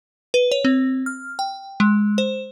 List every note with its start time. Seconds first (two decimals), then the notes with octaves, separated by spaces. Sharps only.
0.34 B4
0.51 C#5
0.65 C4
1.06 F6
1.39 G5
1.80 G#3
2.18 C5